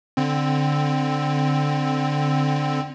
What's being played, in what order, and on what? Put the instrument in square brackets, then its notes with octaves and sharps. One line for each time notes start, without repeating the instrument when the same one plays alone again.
[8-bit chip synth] D3 C4